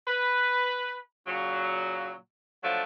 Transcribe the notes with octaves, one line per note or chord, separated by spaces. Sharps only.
B4
A#2 C#3 F#3
F3 F#3 A3 D4